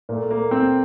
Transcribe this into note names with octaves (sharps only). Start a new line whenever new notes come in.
A#2 A3 A#3
A#3
C4